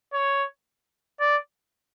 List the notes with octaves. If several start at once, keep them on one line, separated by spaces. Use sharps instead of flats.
C#5
D5